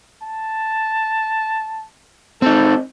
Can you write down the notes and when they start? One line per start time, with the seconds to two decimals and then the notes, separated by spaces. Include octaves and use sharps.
0.23 A5
2.42 C4 D#4 A4